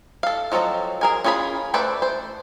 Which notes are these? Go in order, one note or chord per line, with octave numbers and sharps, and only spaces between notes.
A4 F5
F3 F#3 C4 A4 D#5
G#4 A#4 G#5
C#4 F4 G#4 C#5 B5
A3 A4 B4 C5 D5
C5